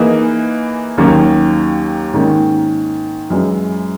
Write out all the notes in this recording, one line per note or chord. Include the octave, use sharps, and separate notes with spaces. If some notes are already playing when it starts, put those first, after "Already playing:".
Already playing: E3 A#3 D#4 G#4 B4
D#2 D#3 F#3 A#3 C#4
G#2 D#3 A#3 C#4
F#2 E3 G#3 C#4